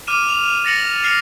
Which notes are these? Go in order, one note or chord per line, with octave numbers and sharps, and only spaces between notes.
D6 F6 D#7 E7
F7
A6 A#6 C#7 F#7
F#7
F6 C7 C#7 F7